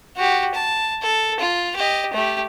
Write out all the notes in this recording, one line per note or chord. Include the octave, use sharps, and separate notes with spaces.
F#4 G4
A5
A4
F4
G4 D#5
A3 G4